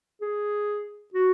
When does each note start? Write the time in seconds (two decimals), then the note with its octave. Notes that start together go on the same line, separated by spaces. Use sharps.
0.21 G#4
1.14 F#4